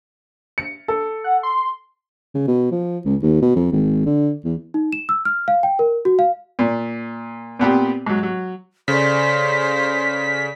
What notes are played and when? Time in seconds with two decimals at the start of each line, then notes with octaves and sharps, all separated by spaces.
0.58 C#7
0.88 A4
1.24 F#5
1.43 C6
2.35 C#3
2.48 B2
2.71 F3
3.05 C#2
3.22 D#2
3.42 B2
3.56 F2
3.72 G#1
4.06 D3
4.45 E2
4.74 D#4
4.93 E7
5.09 E6
5.25 F6
5.48 F5
5.63 G5
5.79 A#4
6.05 F#4
6.19 F5
6.59 A#2
7.59 A#2 B3 C4 G4
8.06 G#2 F#3
8.23 F#3
8.88 C#3 A4 C5 D5 B6